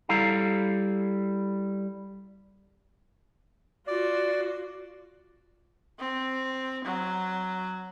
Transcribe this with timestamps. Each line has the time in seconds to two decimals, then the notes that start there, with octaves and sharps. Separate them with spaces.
0.09 G3 E4 A4 F5 A#5
3.87 F4 F#4 D5
6.00 C4
6.85 F#3